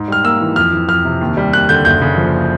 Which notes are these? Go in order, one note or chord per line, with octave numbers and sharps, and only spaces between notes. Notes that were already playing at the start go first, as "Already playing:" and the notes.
Already playing: G#2
G3 F6
A#3 E6
E3
F2 F6
E3
F2 F6
C3
D#2
G3
D#2 F#6
D3 G6
F#1 G6
C#3
F3